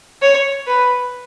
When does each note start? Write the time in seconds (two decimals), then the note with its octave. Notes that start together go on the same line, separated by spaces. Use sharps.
0.22 C#5
0.67 B4